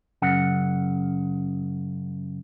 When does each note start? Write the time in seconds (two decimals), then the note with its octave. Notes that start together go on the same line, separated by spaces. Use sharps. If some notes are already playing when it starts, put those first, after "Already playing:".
0.22 F#2 C#3 F#5